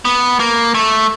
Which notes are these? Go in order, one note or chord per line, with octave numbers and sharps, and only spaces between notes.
B3
A#3
A3